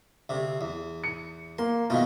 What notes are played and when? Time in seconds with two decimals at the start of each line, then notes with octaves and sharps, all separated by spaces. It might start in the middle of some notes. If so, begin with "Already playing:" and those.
0.29 D2 C3
0.61 E2
1.04 C#7
1.58 A#3 C6
1.90 B2 D#3 A3 F4